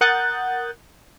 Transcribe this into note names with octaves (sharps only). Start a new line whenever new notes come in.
A#4 F#5 D#6 F#6 G6 A6